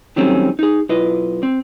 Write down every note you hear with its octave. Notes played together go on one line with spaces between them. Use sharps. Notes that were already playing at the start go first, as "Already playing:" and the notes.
D#3 F#3 G3 A3 C4 C#4
D#4 G#4
B1 E4 F4 B4 D#5
C4